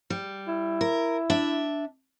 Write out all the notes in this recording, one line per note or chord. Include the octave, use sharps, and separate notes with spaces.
G3
E4
A#4
D4 E5